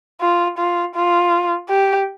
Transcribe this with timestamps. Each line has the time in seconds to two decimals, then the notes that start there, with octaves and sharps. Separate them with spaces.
0.21 F4
0.59 F4
0.96 F4
1.70 G4